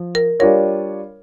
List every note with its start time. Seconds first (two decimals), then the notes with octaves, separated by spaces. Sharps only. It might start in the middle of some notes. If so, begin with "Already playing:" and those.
Already playing: F3
0.15 A#4
0.40 G3 D4 F4 A#4 C#5